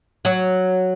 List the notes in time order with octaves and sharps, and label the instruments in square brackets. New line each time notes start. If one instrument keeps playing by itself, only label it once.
[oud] F#3